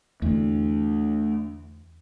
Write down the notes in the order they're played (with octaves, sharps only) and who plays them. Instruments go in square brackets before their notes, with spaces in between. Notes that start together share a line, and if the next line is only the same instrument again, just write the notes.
[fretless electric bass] E2 D3 [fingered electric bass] A3 D4